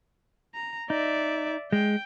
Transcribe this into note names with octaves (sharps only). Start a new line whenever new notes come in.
A#5
D#4 D5 E5
G#3 G5